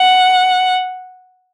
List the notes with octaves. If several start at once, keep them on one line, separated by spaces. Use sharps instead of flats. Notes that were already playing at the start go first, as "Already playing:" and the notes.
Already playing: F#5